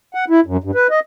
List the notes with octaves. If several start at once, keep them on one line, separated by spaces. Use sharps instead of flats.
F#5
E4
F#2
G2
B4
D#5